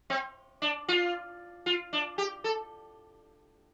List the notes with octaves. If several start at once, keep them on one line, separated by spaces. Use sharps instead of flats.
C4
D4
F4
F4
D4
G4
A4